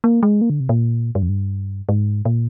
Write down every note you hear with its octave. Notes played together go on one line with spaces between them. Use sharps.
A#3
G#3
A#3
D3
C3
A#2
G2
F2
G2
G#2
A#2